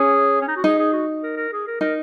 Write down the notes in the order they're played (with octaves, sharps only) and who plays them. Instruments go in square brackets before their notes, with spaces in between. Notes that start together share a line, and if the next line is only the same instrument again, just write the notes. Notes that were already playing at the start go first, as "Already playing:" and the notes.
Already playing: [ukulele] C#4 [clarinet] G#4
[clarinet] C#4
D#4
F#4
[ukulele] D#4 [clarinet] G#4
[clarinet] G#4
F#4
A#4
A#4
G#4
A#4
[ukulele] D#4 [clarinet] A#4